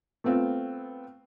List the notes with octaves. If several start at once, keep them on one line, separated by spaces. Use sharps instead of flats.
A3 B3 C4 F4